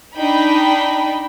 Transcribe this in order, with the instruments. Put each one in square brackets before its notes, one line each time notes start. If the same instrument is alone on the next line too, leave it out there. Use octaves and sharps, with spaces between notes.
[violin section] D4 D#4 G5 B5